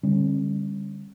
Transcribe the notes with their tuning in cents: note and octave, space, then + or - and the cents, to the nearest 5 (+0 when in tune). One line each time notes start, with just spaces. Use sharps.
D3 +0 G3 +25 C#4 -40